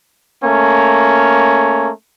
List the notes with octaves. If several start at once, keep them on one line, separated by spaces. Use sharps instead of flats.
A3 A#3 C#4